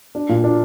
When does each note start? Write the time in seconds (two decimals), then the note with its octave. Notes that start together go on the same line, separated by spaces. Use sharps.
0.15 D4
0.29 A#2
0.44 D4